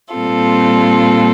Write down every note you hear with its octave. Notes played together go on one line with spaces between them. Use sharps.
A#2 G3 C4 F4 A4